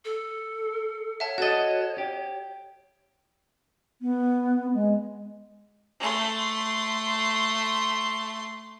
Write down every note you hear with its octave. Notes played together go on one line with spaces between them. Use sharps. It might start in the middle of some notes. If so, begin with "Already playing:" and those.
A4
C#5 E5 F#5 A5
F#4 A4 D#5 F#5 A6
G4
B3
G#3
A3 C6